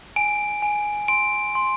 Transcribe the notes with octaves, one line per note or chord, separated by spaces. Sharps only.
G#5 D7
G#5
C6 D7
C6